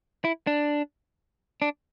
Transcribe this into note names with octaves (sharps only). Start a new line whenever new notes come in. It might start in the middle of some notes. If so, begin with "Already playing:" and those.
E4
D4
D4